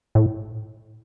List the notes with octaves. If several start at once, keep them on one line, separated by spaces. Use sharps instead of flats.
A2